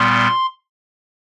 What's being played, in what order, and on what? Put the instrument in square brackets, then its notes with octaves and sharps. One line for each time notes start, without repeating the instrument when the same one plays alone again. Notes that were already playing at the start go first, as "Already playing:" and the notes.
Already playing: [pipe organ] A#2 G3 B3 C6